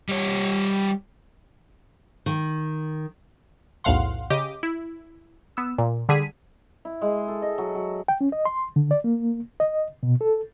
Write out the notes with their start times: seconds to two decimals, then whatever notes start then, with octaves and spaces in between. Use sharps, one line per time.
0.09 G3 C#5
2.26 D#3
3.84 B1 E2 A2 F5 F#5 C6
4.30 C#3 G4 D#5 D6
4.63 E4
5.57 B3 E6
5.78 A#2
6.09 D3 G3 G#4 B6 D#7
6.85 E4
7.02 G#3
7.28 A4
7.42 D#5
7.58 F#3
7.75 F#3
8.08 G5
8.21 C#4
8.32 D#5
8.45 C6
8.76 D3
8.91 D5
9.04 A#3
9.60 D#5
10.03 B2
10.21 A4